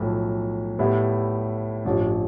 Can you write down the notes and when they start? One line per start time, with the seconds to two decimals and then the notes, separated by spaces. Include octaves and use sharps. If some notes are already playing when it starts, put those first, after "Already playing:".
Already playing: B1 A2 F3
0.79 A2 G3 B3 E4
1.85 A1 G2 F3